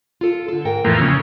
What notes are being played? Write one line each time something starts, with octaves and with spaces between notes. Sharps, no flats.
F4 A4
D3 A4
G#2 A#4 G5
F2 A2 E3 A#3
C#3 C#4